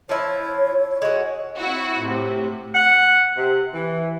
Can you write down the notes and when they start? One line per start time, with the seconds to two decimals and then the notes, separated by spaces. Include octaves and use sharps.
0.09 F3 E4 C#5
1.02 G#3 F#4 C#5
1.58 C4 E4 F#4
2.00 A2 C3
2.75 F#5
3.38 C3
3.73 E3